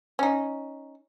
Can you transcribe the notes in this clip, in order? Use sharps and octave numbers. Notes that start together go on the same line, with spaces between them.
C#4 D#4